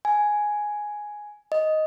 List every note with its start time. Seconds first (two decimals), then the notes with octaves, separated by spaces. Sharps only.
0.05 G#5
1.52 D#5